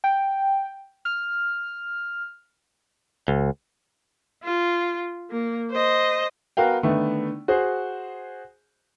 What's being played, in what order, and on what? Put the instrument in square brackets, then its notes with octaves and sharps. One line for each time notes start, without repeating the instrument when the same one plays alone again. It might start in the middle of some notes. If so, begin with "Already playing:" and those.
[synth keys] G5
F6
[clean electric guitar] C#2
[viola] F4
A#3
C5 D#5
[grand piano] B3 F#4 A#4 F5 G5
D3 D#3 A3 B3
F#4 G#4 C5